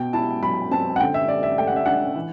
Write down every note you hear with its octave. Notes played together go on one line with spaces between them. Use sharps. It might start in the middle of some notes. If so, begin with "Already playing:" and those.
Already playing: B2 G5
E4 A5
F#3 B5
C4 A5
F#5
D3 G5
E5
D3 D5
E5
A3 G5
F#5
E5
D4 F#5
E3